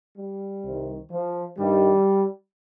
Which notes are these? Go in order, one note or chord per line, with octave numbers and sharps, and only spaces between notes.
G3
C2 C3 D#3
F3
G2 D#3 G3